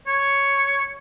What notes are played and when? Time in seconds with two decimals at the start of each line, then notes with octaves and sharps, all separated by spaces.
0.07 C#5